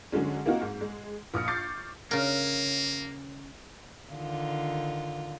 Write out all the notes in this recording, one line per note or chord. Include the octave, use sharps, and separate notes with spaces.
D3 F#3 G#3 C#4
A#3 C4 D#4 F4 F#4
G#2
G#3
A#1 D#6 F6 C#7
C#6 D6 F6 G6 A6 C7
C#3 A#3 A#4
D3 D#3 F4